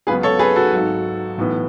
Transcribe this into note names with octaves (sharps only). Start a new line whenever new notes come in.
C#2 C#3 F#3 B3 G#4 B4
A4 C#5
G#4 B4
F#4 A4
G#1 G#2 F#3
B1 A2 E3 B3